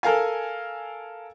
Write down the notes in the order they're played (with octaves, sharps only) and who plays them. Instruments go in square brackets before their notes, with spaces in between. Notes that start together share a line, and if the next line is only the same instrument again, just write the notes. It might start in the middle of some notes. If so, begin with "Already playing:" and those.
[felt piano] A4 A#4 F5 G#5